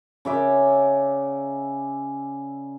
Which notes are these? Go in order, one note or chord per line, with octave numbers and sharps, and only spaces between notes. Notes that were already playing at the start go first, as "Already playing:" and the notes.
C#3 D5 E5